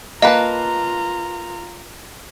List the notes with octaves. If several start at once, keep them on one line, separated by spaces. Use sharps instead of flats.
A#3 F4 B4 D#5 A5 A#5